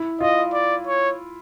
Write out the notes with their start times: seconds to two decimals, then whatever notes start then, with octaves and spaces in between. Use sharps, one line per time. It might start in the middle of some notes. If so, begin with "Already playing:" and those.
Already playing: E4
0.20 F4 D#5
0.53 D5
0.87 C#5